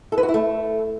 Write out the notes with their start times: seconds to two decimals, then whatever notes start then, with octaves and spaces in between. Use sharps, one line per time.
0.12 A4
0.18 B4
0.23 F#4
0.29 E4
0.34 A3